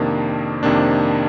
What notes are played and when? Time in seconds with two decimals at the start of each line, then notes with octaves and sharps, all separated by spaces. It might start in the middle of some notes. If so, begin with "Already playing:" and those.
Already playing: F2 C3 D#3 A#3 D4
0.63 F2 C3 D#3 A#3 D4